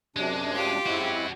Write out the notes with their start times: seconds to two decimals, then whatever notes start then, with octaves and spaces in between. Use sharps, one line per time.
0.16 F#2 C3 G#3 D4
0.53 F4 G4
0.86 G#3 C4 C#4 E4 F#4